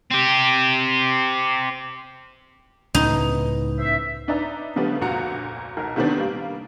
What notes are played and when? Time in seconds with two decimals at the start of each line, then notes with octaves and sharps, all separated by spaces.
0.11 C4 G4
2.95 C#2 A2 B3 C#4 D#4
3.78 C5 E5
4.28 D4 D#4 B4 D5 E5 A#5
4.76 C#3 F3 G3 A3 B3 D4
5.01 F1 D2 A#2 F#4 A#5 C#7
5.77 B1 A#4
5.96 C3 D#3 B3 C4 D4
6.19 G3 A#3